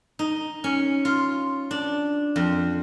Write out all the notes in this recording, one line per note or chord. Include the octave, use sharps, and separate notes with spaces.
D#4
C#4
F4
D4
F2